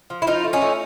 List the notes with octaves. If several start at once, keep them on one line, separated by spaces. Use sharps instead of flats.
F3
E4
F3 D#4 F4
A3
C#4 D#4
A3